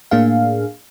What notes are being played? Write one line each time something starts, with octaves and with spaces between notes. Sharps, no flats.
A2 A#3 D4 G#4 F5